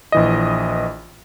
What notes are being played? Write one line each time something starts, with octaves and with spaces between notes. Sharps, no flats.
A#1 E3 D#5